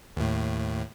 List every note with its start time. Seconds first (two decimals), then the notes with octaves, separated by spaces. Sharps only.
0.17 D#2 A2